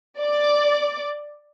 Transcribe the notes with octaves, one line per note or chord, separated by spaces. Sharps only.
D5 D6